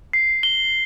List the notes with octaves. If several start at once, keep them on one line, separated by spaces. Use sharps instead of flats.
C7
G7